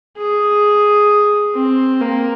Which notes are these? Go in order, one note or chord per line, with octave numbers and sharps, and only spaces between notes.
G#4
C4
A#3